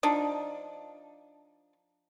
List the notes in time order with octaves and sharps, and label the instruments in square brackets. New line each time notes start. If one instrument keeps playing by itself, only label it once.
[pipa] F3 D4 D#4